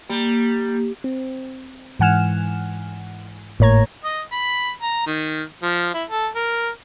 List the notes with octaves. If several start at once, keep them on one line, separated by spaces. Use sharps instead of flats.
G3 A#3
C4
G#2 E3 F#5 G#5 F6 E7
G#1 A2 A#3 C#5 A#5 G#6
D#5
B5
A#5
D#3
F3
E4
A4
A#4